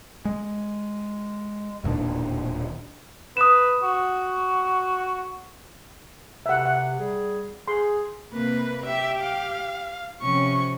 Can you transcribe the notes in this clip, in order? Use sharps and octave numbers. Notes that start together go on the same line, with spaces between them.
G#3
E1 D#2 A#2 D4
B4 D#6 E7
F#4
C3 E5 F#5
F#5
G3 G#4
G#4 C6
C3 A#3 B4
G4 E5
F5
C3 F3 C#4 C#6